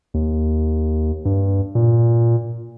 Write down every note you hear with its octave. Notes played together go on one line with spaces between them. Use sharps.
D#2
G2
A#2